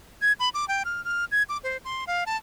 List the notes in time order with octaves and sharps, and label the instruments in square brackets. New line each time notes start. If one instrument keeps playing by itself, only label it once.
[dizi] G#6
B5
D6
G5
F6
F6
G#6
D6
C5
C6
F5
A5